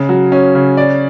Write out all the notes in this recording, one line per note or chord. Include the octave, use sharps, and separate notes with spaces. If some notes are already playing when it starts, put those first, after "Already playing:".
Already playing: C#3
F#3
C#4
C#3
D5